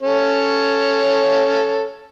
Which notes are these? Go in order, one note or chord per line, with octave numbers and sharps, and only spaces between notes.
C#4 A4 C#5